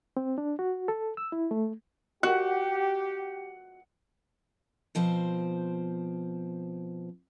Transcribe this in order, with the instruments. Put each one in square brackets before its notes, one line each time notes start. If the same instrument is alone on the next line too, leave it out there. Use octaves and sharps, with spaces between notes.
[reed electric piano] C4
D4
F#4
A4
E6
E4
A3
[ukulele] F#4 [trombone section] G4 [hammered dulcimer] F#5
[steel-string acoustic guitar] B2 F3 C4 C5